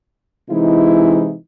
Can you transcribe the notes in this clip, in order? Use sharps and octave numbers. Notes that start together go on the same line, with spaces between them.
C3 E3 G#3 D#4 E4